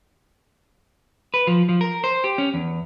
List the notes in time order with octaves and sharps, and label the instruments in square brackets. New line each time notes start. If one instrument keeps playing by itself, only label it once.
[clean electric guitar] B4
F3
F3
A#4
C5
G4
C#4
E2